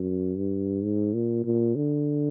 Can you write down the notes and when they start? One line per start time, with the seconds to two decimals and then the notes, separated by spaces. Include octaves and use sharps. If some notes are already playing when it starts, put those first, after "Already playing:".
Already playing: F#2
0.38 G2
0.83 G#2
1.15 A#2
1.44 A#2
1.76 D3